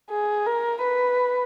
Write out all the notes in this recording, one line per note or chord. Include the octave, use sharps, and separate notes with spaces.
G#4
A#4
B4